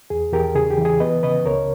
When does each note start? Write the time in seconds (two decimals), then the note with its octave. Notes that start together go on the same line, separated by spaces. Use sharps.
0.10 E2 G#4
0.33 E2 G4 A#4
0.55 C#3 G#4
0.70 G4
0.78 E3
0.85 G#4
1.00 B3 B4 D#5
1.23 C#3 B4 D#5
1.46 C#2 A#4 C#5